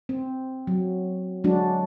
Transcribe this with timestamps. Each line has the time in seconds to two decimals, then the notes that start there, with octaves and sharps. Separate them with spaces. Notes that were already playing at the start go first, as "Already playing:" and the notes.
0.09 C4
0.67 F#3
1.44 F#3 G#3 D4 F#4